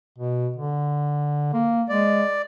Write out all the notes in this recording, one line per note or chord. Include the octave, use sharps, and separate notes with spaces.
B2
D3
A#3
G#3 D5